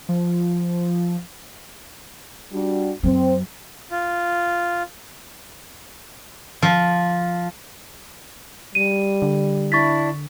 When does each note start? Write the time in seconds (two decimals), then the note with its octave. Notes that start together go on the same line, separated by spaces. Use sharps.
0.09 F3
2.52 G3 D4 F#4
3.03 F#2 F#3 C4
3.91 F4
6.62 F3
8.75 G3 D#7
9.22 D3
9.72 D4 E4 C#6 A6 B6